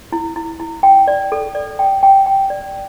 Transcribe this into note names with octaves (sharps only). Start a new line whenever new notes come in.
E4
E4
E4
G5
D5
A4
D5
G5
G5
G5
D5